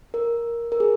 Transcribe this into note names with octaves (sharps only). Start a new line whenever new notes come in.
A#4
A#4
G#4